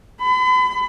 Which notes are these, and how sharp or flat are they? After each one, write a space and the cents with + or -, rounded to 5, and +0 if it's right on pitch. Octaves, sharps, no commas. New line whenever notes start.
B5 +40